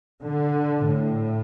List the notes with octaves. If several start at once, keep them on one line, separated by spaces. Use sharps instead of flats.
D3
A2